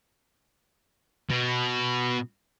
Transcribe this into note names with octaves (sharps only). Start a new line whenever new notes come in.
B2